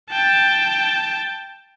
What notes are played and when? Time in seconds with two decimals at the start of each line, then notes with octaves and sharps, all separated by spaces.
0.10 G5 A5